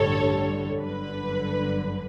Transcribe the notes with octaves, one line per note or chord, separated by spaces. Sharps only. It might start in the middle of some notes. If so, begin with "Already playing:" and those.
Already playing: A1 G2 D3 G3 A4 C#5
G1 F#2 D3 B4